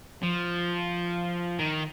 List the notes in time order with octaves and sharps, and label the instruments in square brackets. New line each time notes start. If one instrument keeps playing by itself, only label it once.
[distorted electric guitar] F3
D#3